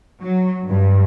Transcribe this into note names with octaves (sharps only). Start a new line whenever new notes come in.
F#3
G2